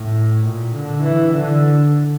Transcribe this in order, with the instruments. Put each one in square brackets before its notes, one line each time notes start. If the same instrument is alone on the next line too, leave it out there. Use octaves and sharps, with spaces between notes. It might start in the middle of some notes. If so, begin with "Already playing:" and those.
Already playing: [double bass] A2
A#2
D3
E3
D3